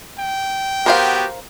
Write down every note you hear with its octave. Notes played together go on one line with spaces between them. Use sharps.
G5
B3 F#4 G4 A#4 C5 F5